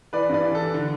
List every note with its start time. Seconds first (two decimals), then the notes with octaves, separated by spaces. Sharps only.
0.13 E3 B4 D5
0.29 G2 B4 D5
0.44 E3
0.55 E3 A4
0.74 D3